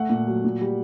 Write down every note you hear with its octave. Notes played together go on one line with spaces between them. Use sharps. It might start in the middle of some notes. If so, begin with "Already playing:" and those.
Already playing: A3 F#5
A#2
F#3
A#2
G3